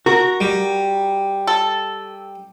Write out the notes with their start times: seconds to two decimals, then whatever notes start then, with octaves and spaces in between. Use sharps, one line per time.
0.06 F#4 A#4
0.40 G3
1.47 A4